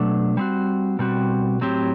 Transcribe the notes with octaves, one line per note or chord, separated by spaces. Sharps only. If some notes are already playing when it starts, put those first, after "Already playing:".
Already playing: B2 F#3 A3 D4
G3 C4 F#4
B2 G3 C4 F#4
A2 F#3 C4 G4